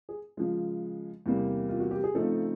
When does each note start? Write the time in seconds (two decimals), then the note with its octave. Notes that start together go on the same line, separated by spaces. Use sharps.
0.09 G#4
0.37 C#3 F3 G#3
1.26 E2 C3 E3 G3 A#3
1.69 F4
1.80 F#4
1.91 G4
2.04 G#4
2.14 C#3 F3 A3 C4 D#4 A4